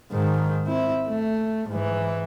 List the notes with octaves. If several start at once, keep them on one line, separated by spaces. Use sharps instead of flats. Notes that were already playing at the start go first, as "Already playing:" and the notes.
G#2 D#3
C4 E4
A3
G#2 E3